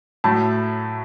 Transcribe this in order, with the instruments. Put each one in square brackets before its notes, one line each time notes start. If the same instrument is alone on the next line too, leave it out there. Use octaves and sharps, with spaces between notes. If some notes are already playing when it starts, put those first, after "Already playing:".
[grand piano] A2 F#3 A3 A5